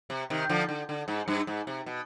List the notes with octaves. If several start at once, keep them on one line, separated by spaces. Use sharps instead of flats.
C3
C3 D#3
D3 F3
D3
D3
G#2
G2
G#2
C3
B2